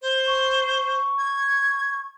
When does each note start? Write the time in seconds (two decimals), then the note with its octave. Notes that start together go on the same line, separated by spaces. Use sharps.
0.01 C5
0.26 C#6
1.18 G#6